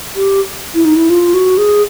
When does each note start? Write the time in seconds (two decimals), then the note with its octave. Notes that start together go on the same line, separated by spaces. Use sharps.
0.16 G4
0.75 E4
0.85 D#4
0.96 E4
1.10 F4
1.34 F#4
1.58 G#4